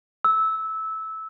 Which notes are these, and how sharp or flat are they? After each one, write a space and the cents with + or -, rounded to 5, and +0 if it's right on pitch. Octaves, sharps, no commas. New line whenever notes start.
E6 -15